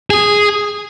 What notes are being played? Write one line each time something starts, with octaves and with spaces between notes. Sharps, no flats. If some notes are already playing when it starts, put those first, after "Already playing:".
G#4